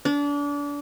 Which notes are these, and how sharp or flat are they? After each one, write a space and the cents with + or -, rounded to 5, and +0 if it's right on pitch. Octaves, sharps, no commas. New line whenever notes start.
D4 -30